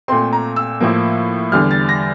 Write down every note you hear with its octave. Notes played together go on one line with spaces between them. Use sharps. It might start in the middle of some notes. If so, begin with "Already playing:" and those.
A#2 A3 C4 C6
A#5
E6
A2 F3 A#3
E2 D3 G3 F6
A6
A#6